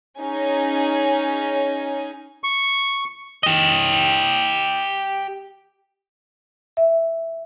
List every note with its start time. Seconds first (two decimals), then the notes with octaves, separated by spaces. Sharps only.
0.19 C#4 D#4 G#4 G#5
2.44 C#6
3.43 G4 D#5
6.77 E5